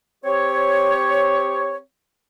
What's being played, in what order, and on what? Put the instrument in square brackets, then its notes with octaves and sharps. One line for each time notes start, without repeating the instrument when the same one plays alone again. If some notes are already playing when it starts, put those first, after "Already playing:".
[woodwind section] C4 G4 C#5